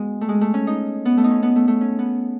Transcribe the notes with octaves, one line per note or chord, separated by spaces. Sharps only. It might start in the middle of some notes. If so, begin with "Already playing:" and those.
Already playing: G#3 B3 F#4
A3
G#3
A3
C#4
D#4
B3
A3
D#4
C#4
B3
A3
A3
C#4
B3